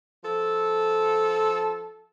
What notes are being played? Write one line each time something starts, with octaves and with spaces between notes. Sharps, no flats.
F3 A4